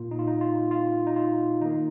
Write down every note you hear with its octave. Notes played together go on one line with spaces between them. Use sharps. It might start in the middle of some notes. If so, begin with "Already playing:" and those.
Already playing: A#2 A#3 F4
D#4
F4
D#4
F4
F4
D#4
F4
D#3 A#3 D#4